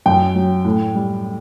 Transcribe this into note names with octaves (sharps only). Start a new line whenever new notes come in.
F#2 G5
F#3
A2
G3